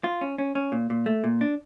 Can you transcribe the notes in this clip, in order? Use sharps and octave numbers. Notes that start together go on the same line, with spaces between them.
F4
C#4
C#4
C#4
A#2
A#2
A3
A#2
D4